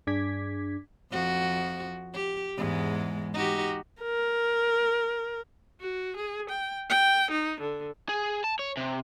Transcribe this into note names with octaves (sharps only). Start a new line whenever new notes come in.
G2 D4 G#4 D6 G#6 B6
F2 F3 F#4
G4
E2 G#2 G#3
D#4 F#4 G4
A#4
F#4
G#4
G5
G5
D#4
D3
G#4
A5
C#5
C3